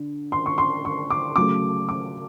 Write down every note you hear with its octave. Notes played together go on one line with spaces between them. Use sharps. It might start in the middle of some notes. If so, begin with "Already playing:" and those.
Already playing: D3
C6
C#6
C6
C#6
D6
C#3 F#3 A3 D6
D6